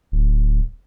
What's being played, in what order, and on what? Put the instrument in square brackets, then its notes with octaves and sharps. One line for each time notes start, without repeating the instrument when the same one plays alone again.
[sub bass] D1